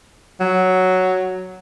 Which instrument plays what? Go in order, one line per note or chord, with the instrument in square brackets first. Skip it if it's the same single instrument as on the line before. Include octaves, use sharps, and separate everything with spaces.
[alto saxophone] F#3